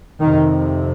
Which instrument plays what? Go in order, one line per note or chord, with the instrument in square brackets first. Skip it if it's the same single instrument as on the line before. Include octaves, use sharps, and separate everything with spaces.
[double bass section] F2 C3 D#3